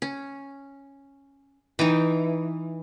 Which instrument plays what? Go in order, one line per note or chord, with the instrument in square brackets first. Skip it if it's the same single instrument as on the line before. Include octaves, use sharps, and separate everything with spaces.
[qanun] C#4
[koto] E3 [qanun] D#4 D#5 G5